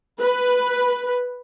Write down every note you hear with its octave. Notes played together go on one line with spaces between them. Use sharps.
B4